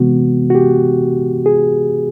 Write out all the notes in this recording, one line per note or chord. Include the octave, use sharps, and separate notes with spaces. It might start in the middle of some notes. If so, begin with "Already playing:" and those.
Already playing: C3 E3 G#3 B3 F#4
F#4
G4
G#4